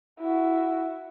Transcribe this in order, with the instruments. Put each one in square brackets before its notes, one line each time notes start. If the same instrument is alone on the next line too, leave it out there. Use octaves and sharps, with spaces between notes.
[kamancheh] E4 F#4